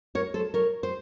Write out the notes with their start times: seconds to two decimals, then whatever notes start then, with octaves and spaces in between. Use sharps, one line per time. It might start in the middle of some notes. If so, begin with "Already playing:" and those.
0.15 A#4 C#5
0.34 A4 C5
0.54 A#4 C#5
0.83 C5